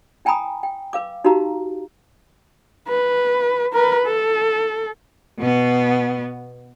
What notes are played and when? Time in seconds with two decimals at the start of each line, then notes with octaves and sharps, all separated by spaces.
0.25 E4 G5 G#5 A#5 B5 D#6
0.63 G5
0.93 B4 F5 D6
1.24 D#4 F#4 G4 B4 F5 A#5
2.88 B4
3.73 A#4 B4
4.06 A4
5.39 B2 B3